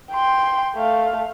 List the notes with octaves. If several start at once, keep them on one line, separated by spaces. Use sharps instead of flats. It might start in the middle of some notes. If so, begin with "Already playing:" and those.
G5 C6
A3 F5